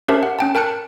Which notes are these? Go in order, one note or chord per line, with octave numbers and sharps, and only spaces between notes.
C#4 G4 A#4 C5 E5 A5
F#5
C#4 G5 A5
A#4 G5 A5 F#6 C#7